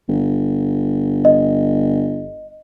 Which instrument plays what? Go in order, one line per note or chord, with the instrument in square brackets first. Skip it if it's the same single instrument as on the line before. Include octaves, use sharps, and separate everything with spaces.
[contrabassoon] G1
[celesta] D#5